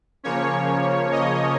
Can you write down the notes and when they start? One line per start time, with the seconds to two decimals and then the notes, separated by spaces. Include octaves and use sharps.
0.24 C#3 F3 A#3 C#4 C#5
1.12 D#5